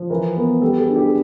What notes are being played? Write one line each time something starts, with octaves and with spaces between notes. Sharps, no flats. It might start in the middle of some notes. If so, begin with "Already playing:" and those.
Already playing: F3
E3 A#4
B3 A#4
G3 A4
G#4
D4
G4
G#4